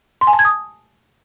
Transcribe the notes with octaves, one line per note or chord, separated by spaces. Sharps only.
C6
G#5
A5
G#6
D#6